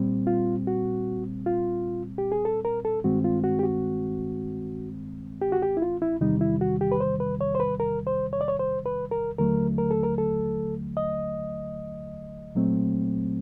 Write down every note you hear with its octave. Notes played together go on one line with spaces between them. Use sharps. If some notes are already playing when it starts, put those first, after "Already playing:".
Already playing: A#2 G3 C4
F4
F#4
F4
G4
G#4
A4
A#4
A4
G2 D#3 G#3 C4 F#4
F4
F#4
G4
F#4
G4
F#4
G4
E4
F4
E4
E2 C3 D#3 G3 D#4
E4
F#4
G4
B4
C5
B4
C#5
C5
B4
A#4
C5
C#5
D5
C#5
C5
B4
A#4
D#2 D3 F#3 A3 A#4
A#4
A4
A#4
A4
D#5
A#2 F#3 A3 C4